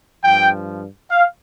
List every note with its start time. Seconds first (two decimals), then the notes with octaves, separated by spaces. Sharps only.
0.24 G2 F3 G5
1.11 F5